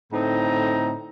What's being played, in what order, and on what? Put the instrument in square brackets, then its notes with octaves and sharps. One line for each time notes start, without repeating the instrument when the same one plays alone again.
[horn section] A2 D3 C4 D#4 A#5